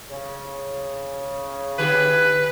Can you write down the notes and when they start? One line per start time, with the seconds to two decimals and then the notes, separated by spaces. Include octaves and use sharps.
0.10 C#3
1.79 D3 G4 G#4 B4